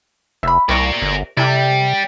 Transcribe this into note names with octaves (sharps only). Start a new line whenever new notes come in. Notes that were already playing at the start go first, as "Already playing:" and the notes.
F1 E5 B5
C2 C3 A#4 D5 C#6
G1
C3 E4 A4 D5 G5